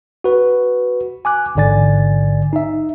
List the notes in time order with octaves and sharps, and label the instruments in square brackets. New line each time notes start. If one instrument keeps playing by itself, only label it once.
[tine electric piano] F#4 B4
G#5 D6 F#6
A1 G#2 D3 D5 G#5 A6
D#4 E5